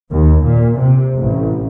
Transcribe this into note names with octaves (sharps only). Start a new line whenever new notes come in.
D#2
A#2
C3
A1